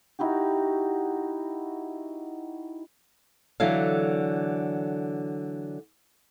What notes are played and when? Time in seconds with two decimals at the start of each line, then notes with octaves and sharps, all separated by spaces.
0.19 D#4 E4 F#4 G4
3.60 D3 E3 F#3 A4 E5 F5